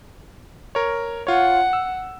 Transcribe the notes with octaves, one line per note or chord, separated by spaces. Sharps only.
A#4 C#5
F4 C#5 F#5
E6